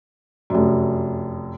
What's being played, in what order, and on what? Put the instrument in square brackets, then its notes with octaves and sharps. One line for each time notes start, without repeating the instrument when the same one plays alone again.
[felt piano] F1 F#2